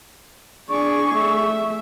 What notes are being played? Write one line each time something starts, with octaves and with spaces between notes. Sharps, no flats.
D4 G#4 D5 C#6
A3 E5